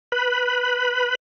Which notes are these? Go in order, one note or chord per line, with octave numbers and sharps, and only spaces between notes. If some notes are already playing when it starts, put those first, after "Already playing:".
B4 B5